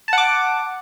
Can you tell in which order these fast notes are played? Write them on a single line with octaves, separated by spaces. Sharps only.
A5 F#5 D6